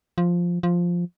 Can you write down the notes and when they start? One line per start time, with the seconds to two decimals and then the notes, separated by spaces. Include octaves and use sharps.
0.18 F3
0.63 F3